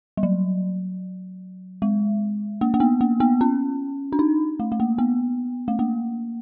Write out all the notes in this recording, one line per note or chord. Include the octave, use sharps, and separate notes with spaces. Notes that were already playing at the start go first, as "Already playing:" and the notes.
G3
F#3
G#3
A#3
A#3
B3
A#3
B3
C#4
D4
D#4
A3
A3
A#3
B3
A3
A#3